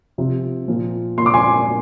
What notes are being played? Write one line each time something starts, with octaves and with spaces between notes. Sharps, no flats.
C3 F3
A#2 F3
A#2 F3 C6 D6
G#5 C6